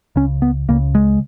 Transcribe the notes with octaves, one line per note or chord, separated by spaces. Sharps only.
C#2 C#3 C#4
B3
C#2 C#3 A#3
G#3